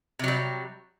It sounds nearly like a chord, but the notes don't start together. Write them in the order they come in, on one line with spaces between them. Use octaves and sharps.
C3 F#3 G3